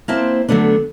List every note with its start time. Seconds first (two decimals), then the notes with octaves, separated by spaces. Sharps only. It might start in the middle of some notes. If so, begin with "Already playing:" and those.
0.08 A#3 C4 E4 C5 A5
0.48 D3 F#3 A3 B3 D4